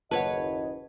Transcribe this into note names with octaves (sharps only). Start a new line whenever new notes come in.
F#1 D#2 B4 C#5 D#5 F#5 A5